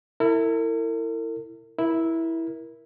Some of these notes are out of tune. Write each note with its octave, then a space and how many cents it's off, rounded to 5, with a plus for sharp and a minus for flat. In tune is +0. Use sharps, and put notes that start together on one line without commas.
E4 +0 A#4 -45
E4 -5 A#4 +20